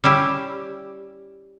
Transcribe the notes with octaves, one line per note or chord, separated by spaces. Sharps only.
G3 C#4 E4 G4